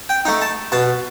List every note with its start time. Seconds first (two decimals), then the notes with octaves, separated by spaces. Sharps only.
0.09 G5
0.25 A3 D#4
0.42 A5
0.72 B2 A5